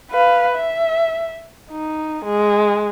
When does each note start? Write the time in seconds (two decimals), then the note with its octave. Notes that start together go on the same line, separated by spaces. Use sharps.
0.11 B4 F5
0.55 E5
1.71 D#4
2.24 G#3